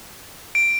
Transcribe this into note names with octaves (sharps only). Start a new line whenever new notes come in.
D7